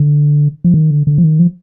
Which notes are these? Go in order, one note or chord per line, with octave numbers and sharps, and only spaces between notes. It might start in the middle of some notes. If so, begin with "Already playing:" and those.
Already playing: D3
F3
D#3
D3
D3
F3
D#3
F3